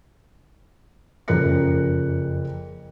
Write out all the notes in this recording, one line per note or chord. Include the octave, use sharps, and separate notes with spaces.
F#1 F2 G#4 A#4 F#6 C#7